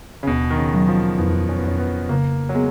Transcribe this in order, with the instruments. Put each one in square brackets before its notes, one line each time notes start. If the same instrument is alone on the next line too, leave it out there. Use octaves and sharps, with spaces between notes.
[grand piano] C#3
[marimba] D#2 [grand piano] B2
[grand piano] D#3
C#3
[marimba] F#3
[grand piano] F3
[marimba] F2 [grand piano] B3
[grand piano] C#4
B3
[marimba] F2 [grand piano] C#4
[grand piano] B3
[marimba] C#3 [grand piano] A#3
[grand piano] F#3
[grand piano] G#3 [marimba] B3